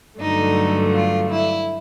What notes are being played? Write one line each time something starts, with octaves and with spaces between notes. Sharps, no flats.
G2 D3 F#3 A3 D#4
F4
E4